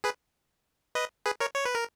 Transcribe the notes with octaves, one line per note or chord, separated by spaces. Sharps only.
G#4 B4
B4 D#5
G#4 B4
A#4 C#5
C#5
B4
A#4